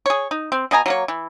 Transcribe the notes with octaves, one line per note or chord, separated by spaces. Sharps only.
G#4 C#5
D#4
C4
B2 D#5 G#5 A#5
F#3 A#3 C#5
E3